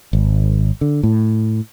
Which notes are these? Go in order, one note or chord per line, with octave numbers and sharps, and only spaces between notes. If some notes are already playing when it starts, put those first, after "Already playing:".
G#1
D3
A2